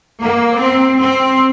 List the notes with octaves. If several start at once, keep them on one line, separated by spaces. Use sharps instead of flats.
A#3
C4
C4